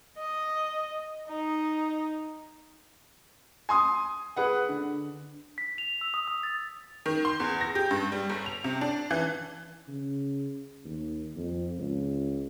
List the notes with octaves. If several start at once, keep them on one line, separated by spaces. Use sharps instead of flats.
D#5
D#4
G#5 C6 D#6
G#4 B4 F#5
D3
B6
F7
E6
D#6
D#6
A6
D#3
C6
E2
A#6
G4
G2
G3
G1
F7
C3
D4
E3
C#3
D#2
F2
C#2